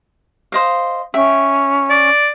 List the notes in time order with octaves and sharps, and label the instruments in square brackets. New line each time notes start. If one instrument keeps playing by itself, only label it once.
[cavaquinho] C5 D#5 F5
[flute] C#4 [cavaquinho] E5 G5
[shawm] D5